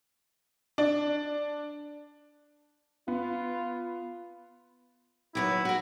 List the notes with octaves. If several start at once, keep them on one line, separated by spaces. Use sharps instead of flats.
D4
B3 F4
D#2 F#3 E4 B4
F#4 A#4